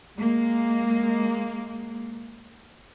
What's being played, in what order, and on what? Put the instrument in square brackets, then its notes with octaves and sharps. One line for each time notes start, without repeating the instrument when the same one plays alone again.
[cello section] G#3 A#3